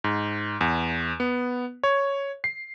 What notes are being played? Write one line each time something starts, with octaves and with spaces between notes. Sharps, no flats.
G#2
E2
B3
C#5
C7